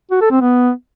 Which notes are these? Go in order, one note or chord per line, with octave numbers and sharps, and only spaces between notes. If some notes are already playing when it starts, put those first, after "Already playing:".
F#4
A4
C4
B3